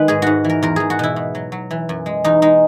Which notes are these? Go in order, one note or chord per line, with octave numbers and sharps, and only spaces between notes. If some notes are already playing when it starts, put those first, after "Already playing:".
Already playing: D#3 G#3 B4
G#2 G#4
G#2 F#4
E3 A#4
E2 A#4
E2 G#4
F#4
B2 E4
B2
F#3
F#3
E3
F#2
G#3
E2 D#4
G#3 D#4